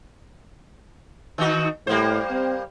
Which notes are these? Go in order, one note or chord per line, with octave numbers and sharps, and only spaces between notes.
D#3 D#4 F#4
A2 G3 A#3 C5
C4